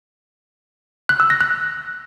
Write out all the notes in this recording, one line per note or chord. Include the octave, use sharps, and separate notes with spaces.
F#6
E6
A#6
F#6